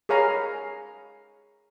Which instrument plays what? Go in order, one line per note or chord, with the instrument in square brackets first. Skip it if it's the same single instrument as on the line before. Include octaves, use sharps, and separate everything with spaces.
[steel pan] G#4 A#4 C#5 F5 A#5 B5